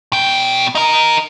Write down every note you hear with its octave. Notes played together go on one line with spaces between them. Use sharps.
B2 G5
D#4 A#4